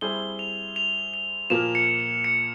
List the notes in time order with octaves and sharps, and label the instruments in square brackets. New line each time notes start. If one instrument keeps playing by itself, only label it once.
[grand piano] G3 C4 E4 G#4 C5 [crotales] G7
[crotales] F7
F7
F7
[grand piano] A#2 F3 A#3 [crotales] E7
[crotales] C#7
E7
C#7